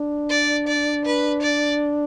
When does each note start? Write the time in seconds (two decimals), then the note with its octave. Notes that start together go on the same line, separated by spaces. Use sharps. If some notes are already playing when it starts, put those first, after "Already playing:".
Already playing: D4
0.30 D5
0.67 D5
1.05 B4
1.42 D5